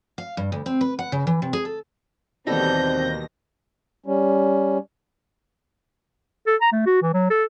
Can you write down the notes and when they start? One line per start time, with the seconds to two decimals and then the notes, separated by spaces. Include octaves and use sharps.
0.18 F5
0.37 G2
0.52 D2
0.66 C4
0.81 B4
0.99 F#5
1.12 C#3
1.27 E3
1.42 C3
1.53 G#4
1.65 A4
2.47 D#2 B2 E3 G3 C4 A4 G6 A#6
4.06 G3 C#4
6.47 A4
6.61 A#5
6.72 A3
6.86 F#4
7.02 E3
7.13 F#3
7.30 A4